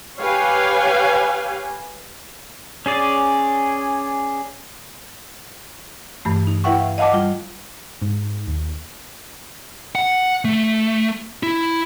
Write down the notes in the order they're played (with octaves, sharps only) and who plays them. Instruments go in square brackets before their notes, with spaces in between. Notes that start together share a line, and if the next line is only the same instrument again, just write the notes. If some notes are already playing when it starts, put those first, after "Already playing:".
[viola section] G4 B4 C#5 F5 G5 G#5
[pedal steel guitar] C#4 G#4 D5
[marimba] G2 E3 A3
D#4
E4 B4 E5 F#5 G5 C#6
F5
D#5 F5 F#5 A5 D6
G3 F4
[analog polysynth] G#2
D#2
[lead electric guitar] F#5
A3
E4